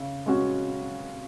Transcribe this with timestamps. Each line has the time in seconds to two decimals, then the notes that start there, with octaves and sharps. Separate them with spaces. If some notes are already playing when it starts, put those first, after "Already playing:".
Already playing: C#3
0.26 G#3 C#4 F#4